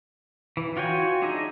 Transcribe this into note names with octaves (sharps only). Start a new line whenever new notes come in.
E3
F4 F#4 C#5 G5 G#5
D4 D#4 G#4 D#5 E5